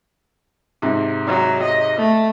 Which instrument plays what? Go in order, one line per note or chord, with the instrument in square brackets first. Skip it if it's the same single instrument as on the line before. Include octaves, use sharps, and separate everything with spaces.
[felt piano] G#2 C3
[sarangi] F#3
D#5
A3